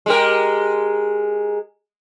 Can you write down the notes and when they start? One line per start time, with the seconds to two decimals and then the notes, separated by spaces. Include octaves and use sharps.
0.06 G#3 G4 A#4